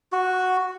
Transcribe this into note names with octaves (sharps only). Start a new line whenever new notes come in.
F#4